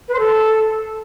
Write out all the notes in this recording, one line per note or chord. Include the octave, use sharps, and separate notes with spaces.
B4
C5
A4